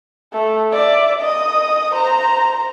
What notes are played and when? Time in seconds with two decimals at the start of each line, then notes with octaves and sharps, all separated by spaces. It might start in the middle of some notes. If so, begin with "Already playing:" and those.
0.33 A3
0.71 D5 E5
1.21 D#5 D#6
1.94 C5 A#5